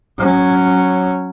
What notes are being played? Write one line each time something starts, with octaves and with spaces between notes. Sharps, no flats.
F#3 C#4